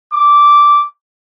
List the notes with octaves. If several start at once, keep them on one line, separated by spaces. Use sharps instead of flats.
D6